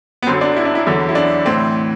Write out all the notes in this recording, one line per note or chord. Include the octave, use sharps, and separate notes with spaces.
B3
F#2 D3 F#3 C4
D4
E4
D4
E4
E2 D3 F#3
E4
D4
A2 E3 C4